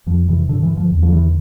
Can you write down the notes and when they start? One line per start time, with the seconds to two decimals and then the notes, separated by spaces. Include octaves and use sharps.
0.06 F2 F3
0.28 C3 E3
0.49 G2 D3
0.62 E3
0.70 D3
0.77 F3
0.91 E2
1.03 F3
1.12 D3 E3